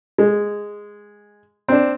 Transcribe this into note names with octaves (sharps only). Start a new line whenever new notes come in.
G#3
C4 D4